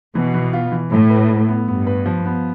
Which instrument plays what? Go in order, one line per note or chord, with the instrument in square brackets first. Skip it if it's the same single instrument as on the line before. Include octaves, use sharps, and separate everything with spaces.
[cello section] B2 [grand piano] E3
[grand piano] E3
F4
E3
[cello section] A2 [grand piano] E4
[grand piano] B4
E4
B3
[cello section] G2 [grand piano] B3
[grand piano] B4
F3
B3